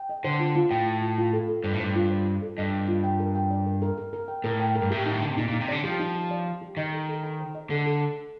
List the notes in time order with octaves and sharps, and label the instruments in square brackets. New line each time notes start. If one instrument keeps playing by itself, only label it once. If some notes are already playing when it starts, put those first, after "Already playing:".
Already playing: [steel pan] G5
D#5
[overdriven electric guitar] D3 [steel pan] C5
[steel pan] F4
F4
[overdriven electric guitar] A2 [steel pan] G5
[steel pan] F4
F4
F4
A4
A4
[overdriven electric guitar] G2 [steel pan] C5
[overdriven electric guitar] A2
[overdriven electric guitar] G2 [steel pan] C5
[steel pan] F4
C5
F4
A4
[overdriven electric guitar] G2 [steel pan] D#5
[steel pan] D#5
F4
G5
A#4
G5
D5
A#4
A#4
A#4
A#4
G5
[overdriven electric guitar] A2 [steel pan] A#4
[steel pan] G5
A#4
[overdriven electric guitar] G2
[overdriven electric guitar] A2 [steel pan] G4
[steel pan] D#4
[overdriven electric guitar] D#3
[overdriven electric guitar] D3 [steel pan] D#4
[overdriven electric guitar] C3
[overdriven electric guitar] A#2 [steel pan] D#4
[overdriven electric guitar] A#2
[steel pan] D#4
[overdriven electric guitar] C3
[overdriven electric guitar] D3 [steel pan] D5
[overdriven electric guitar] F3 [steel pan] G4
[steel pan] D#4
G4
D5
G4
G4
[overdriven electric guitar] D#3 [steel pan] D#5
[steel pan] A4
A4
A#5
C5
D#5
[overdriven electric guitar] D3 [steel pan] A4
[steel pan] A4